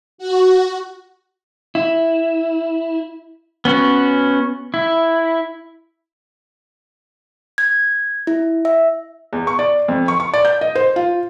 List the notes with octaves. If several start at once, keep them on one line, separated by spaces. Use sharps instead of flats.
F#4
E4
B3 C#4 F#4
E4
G#6
E4
E5
E2
C#6
D5
F2
C#6
C#6
D5
G6
D#5
C5
F4